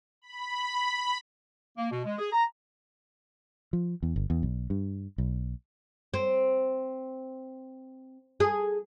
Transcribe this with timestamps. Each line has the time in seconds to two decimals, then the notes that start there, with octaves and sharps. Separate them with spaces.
0.22 B5
1.78 A#3
1.91 B2
2.05 G#3
2.19 G#4
2.33 A#5
3.73 F3
4.03 E2
4.16 G1
4.30 E2
4.43 B1
4.70 G2
5.18 B1
6.14 C4
8.40 G#4